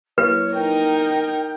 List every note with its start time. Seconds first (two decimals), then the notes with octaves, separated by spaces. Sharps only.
0.18 F#3 A#3 E4 B4 C#5
0.54 D#4 A#4 G5